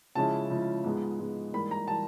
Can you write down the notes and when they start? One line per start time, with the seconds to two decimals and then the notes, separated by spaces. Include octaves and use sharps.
0.15 C#3 F3 G#3 C#4 E4 A5
0.50 C#3 F3 G#3 C#4 E4
0.84 G#2 F3 G#3 B3
1.19 G#2 F3 G#3 B3
1.53 G#2 E3 G3 A#3 B5
1.71 A#5
1.88 E3 G3 A#3 A5